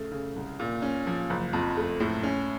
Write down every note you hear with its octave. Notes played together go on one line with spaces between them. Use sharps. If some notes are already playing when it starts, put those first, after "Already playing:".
Already playing: C#3 A3
C#3
C2
A#2
C#4
F3
F#1
F2
A3
A2
C#4